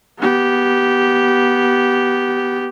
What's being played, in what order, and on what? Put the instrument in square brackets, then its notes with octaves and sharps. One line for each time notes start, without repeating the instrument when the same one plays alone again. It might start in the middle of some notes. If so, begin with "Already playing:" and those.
[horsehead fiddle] B3 G4